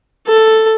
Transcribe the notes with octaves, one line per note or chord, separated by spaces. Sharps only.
A4